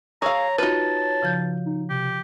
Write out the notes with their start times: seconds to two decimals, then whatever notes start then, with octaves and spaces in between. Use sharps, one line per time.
0.22 G#4 C#5 F5 A#5 C#6 E6
0.58 D#4 F4 F#4 B4 A5
1.22 C#3 F3 G6
1.66 D#4
1.90 C3 G4